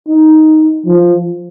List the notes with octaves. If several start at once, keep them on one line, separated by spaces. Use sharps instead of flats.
D#4
F3